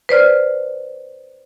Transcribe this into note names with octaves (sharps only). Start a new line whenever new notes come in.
B4 C5 D5 F6